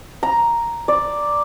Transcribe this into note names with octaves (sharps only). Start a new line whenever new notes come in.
A#5
D5